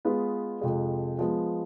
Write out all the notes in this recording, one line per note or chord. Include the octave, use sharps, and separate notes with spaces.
G#3 B3 F4 G#4 B4
F2 C3 F3 G#3
F3 G#3 B3